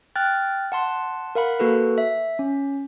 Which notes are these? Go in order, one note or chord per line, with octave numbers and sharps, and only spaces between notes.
G5 F6 F#6 A6
F#5 A5 C6
A#4 F5 F#5 B5
A#3 F#4 A4 B4
E5
C#4